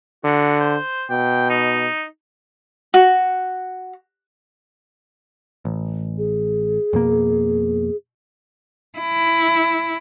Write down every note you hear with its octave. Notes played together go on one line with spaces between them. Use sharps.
D3 F#4
C5
B2 G5
D#4
F#4
A1
G#4
F2 B2 A#3
E4